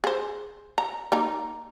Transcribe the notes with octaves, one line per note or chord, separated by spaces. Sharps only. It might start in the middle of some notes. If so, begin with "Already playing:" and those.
G#4 C5
A#5
A#3 D#4 A#5